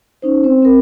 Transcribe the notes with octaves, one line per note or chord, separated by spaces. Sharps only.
C#4 D#4 C5
C4 C5
C4 A#4